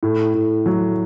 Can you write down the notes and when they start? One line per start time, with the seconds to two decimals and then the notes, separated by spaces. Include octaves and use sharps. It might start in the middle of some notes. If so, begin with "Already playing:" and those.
0.03 A2
0.34 A2
0.66 F#3